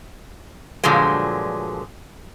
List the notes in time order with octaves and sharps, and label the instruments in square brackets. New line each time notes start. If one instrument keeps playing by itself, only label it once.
[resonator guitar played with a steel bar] G2 A#2 D3 F3 F#3 G#3